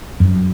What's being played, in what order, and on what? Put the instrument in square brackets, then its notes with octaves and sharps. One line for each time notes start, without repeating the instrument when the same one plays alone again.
[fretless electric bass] F#2